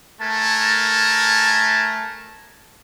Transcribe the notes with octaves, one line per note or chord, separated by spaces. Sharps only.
A3 A#4 G#5 A5